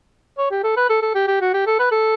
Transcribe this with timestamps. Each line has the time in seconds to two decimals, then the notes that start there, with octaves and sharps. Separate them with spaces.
0.38 C#5
0.51 G4
0.63 A4
0.77 B4
0.89 A4
1.02 A4
1.15 G4
1.28 G4
1.41 F#4
1.53 G4
1.66 A4
1.79 B4
1.91 A4